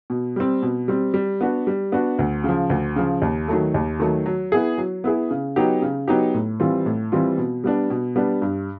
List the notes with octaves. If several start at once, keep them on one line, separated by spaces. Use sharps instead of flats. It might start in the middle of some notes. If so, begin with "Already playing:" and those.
B2
G3 C4
B2
G3 C4
G3
B3 D4 F#4
G3
B3 D4 F#4
D2
C#3 F3
D2
C#3 F3
D#2
D#3 F#3 A3
D#2
D#3 F#3 A3
F#3
B3 E4 G#4
F#3
B3 E4 G#4
C#3
F#3 B3 D#4 G4
C#3
F#3 B3 D#4 G4
A2
E3 G3 C4 F4
A2
E3 G3 C4 F4
B2
G3 B3 D4
B2
G3 B3 D4
G2